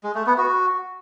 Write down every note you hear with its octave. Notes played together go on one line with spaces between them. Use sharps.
G#3
A3
B3
F#4